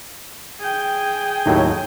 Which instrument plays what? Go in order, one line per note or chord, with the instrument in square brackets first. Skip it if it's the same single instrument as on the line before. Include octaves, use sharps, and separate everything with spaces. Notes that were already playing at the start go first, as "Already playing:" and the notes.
[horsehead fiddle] G#4 G5
[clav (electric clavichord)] D#2 A2 F#3